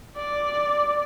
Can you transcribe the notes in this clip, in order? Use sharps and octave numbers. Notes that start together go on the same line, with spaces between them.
D5